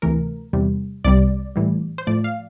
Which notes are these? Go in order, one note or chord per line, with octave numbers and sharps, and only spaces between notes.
D2 C3 E3 A3 A#4
E2 C3 G3
C2 C3 G3 D5
A2 E3 G3
C5
A2 F3 A3 D5
F5